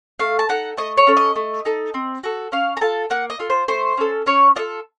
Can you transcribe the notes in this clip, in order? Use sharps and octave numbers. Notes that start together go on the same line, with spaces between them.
A3 F5
A5
D#4 A4 F#5
A3 D#5
C#5
C#4 A4
D#5
A3
D#4 A4
C4
F#4 A4
C#4 F5
A#5
F4 A4 A5
A#3 F#5
D#5
F4 A4
C5
A3 C5
C#4 A4
C#4 C#5
F4 A4 D#5